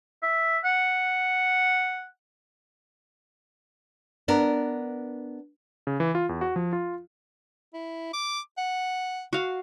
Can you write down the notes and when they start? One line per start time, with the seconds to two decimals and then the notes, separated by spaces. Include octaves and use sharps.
0.22 E5
0.64 F#5
4.28 B3 D4 A#4
5.87 C#3
6.00 E3
6.15 F4
6.29 E2
6.41 F#4
6.56 F3
6.73 F4
7.74 E4
8.14 D6
8.58 F#5
9.33 F#4 F5